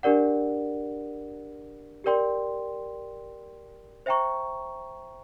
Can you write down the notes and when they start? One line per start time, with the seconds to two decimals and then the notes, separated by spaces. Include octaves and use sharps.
0.03 D4 G4 A#4 D5 F#5
2.04 G4 A#4 D5 G5 C6
4.06 C5 E5 G5 A#5 C#6